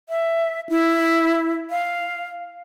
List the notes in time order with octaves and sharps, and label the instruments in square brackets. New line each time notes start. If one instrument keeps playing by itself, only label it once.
[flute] E5
E4
F5